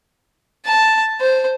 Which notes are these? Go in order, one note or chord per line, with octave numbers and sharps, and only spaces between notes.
A5
C5